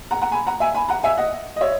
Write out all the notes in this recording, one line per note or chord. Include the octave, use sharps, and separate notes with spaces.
F#5 A#5
F#5 A#5
G#5 B5
F#5 A#5
E5 G#5
G#5 B5
F#5 A#5
E5 G#5
D#5 F#5
D#5
C#5 E5